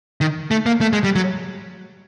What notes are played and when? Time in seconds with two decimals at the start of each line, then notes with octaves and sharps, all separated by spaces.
0.21 D#3
0.51 A3
0.66 A#3
0.81 A3
0.93 G#3
1.04 G3
1.16 F#3